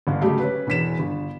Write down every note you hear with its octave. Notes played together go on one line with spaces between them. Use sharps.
G1 D3 F5
C#3 F#3 G#3 A3 G4
C#4 B4
E1 E2 B6 E7
G1